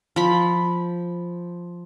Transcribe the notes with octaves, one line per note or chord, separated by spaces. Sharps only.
F3 B5